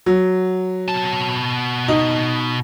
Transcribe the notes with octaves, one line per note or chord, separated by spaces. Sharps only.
F#3
B2 A5
D#4